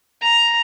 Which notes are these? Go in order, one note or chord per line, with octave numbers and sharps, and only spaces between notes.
A#5